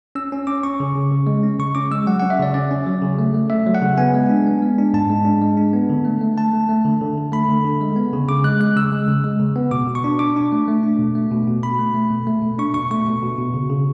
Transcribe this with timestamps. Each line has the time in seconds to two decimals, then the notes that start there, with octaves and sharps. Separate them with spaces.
0.15 C#4 E6
0.32 C#4
0.47 C#4 D6
0.63 C#4 C#6
0.80 C#3
0.95 C#3
1.12 C#3
1.27 G#3
1.43 C#4
1.59 C#3 C#6
1.75 C#4 D6
1.91 G#3 E6
2.07 F#3 F#5
2.19 C#4 F#5
2.30 E5
2.39 C#3 D5
2.54 C#4 D5
2.71 C#4
2.87 F#3
3.02 C#3
3.19 A3
3.35 A3
3.50 A3 E5
3.66 F#3
3.75 F#5
3.82 C#3
3.98 B3 G#5
4.14 G#3
4.29 D4
4.47 B3
4.62 G#3
4.78 D4
4.94 G#2 A5
5.10 G#3
5.25 D4
5.42 G#3
5.57 D4
5.73 B3
5.90 D3
6.05 A3
6.21 A3
6.37 A3 A5
6.53 A3
6.69 A3
6.85 D3
7.01 D3
7.17 D3
7.32 A3 B5
7.49 D3
7.65 D3
7.81 G#3
7.96 B3
8.13 C#3
8.28 C#3 D6
8.44 G#3 F#6
8.60 G#3 F#6
8.76 C#3 E6
8.92 G#3
9.08 C#3
9.24 G#3
9.40 C#3
9.56 B3
9.71 B2 D6
9.87 B2
9.95 C#6
10.04 D4
10.19 D4 D6
10.36 D4
10.52 A3
10.68 A3
10.83 D4
10.99 B2
11.15 A3
11.31 B2
11.48 B2
11.63 B2 B5
11.79 A3
11.94 A3
12.11 B2
12.27 A3
12.42 B2
12.58 D4 C#6
12.74 B2 C#6
12.91 A3 C#6
13.07 B2
13.23 B2
13.38 B2
13.54 C#3
13.70 C#3